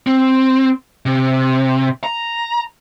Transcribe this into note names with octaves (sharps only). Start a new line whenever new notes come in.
C4
C3
A#5